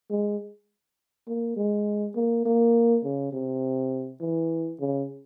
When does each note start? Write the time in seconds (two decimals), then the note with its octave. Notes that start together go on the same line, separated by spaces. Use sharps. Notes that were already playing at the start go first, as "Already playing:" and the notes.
0.10 G#3
1.27 A#3
1.57 G#3
2.15 A#3
2.46 A#3
3.04 C#3
3.33 C3
4.21 E3
4.80 C#3